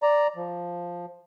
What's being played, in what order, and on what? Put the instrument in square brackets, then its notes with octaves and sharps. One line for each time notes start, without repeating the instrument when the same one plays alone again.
[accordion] D5 A#5
F3